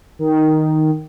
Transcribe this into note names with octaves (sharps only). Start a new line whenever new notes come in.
D#3